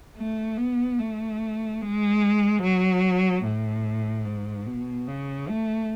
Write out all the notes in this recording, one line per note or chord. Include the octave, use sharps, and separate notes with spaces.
A3
B3
A3
G#3
F#3
A2
G#2
B2
C#3
A3